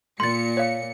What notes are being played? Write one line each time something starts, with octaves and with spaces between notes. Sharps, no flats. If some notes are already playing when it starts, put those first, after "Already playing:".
A#2 C6 A6 C#7
C#5 F5